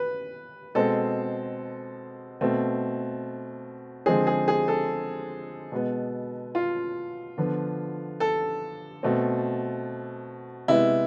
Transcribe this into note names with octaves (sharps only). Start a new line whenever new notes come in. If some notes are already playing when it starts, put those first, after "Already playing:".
Already playing: B4
B2 G#3 C4 A4
B2 A3 C4
D3 F3 G#3 C4 G#4
G#4
G#4
A4
B2 G#3 B3
F4
D3 F3 B3
A4
B2 A3 C4
C3 G#3 B3 E4